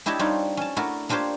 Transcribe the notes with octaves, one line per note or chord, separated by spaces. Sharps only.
D4 E4 G4 C#5 D#5 A5
G3 C4 D4 D#4 F4 C#5
C#4 A5
A3 D4 E4 F#4 A4 A#4
A#3 D4 F4 G4 C5 C#5